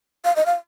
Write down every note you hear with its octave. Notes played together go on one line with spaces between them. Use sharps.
F5
D#5
F5